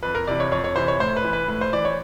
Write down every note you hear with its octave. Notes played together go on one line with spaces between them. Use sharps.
F2 B4
A#4
C3 E3 D5
C#5
F2 C#5
C#5
C3 E3 C5
C#5
A2 C5
B4
E3
B4
A2 B4
C5
E3 D5
C#5